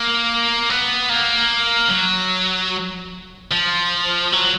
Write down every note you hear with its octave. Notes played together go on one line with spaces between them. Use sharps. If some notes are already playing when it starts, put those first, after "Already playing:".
Already playing: A#3
B3
A#3
F#3
F3
F#3